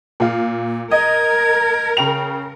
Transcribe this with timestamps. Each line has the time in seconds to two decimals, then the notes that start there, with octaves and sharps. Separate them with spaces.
0.20 A#2 F4
0.91 A#4 D#5 G#6
1.97 C#3 G5 F7